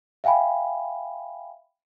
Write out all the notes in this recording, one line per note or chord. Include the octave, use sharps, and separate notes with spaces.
E5 F5 G5 G#5 B5